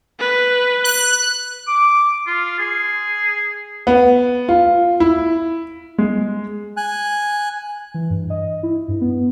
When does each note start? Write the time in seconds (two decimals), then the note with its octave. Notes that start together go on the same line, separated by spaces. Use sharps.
0.20 B4
0.84 F#6
1.68 D6
2.27 F4
2.59 G#4
3.87 B3
4.49 F4
5.00 E4
5.98 G#3
6.77 G#5 F#6
7.94 E3
8.10 G2
8.30 D#5
8.63 E4
8.88 G2
9.01 B3